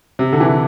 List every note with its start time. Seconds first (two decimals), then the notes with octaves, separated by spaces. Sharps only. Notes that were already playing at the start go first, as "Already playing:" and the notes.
0.19 C3
0.33 D3
0.40 E3